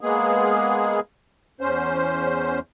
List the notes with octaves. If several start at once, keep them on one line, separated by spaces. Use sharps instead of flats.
G#3 A#3 B3 G#4
E2 C#4 C5